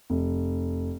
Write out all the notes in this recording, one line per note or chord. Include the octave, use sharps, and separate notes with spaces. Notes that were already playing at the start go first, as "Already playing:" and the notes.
F1